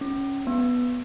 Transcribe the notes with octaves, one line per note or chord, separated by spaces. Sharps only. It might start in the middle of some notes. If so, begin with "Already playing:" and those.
C#4
B3